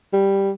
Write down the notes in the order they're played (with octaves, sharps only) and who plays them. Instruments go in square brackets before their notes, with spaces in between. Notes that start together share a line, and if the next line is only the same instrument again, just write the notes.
[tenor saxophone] G3